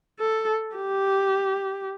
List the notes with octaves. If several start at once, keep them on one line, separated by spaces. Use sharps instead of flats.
A4
G4